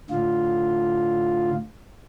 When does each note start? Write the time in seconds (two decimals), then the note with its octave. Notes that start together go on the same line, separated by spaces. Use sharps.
0.11 A2 D3 F4